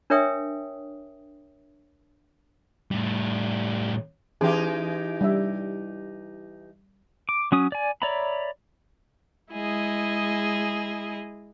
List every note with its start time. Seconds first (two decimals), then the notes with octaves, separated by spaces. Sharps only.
0.10 D4 A#4 C#5 E5 G5 D#6
2.91 A2 G3
4.41 E3 C#4 D#4 G4 G#4
5.21 G3 D4 E5
7.29 D6
7.52 F#3 C#4 D#6
7.72 D5 G#5
8.02 C#5 D5 E5 A#5 B5
9.51 G#3 E4 G#4 D#5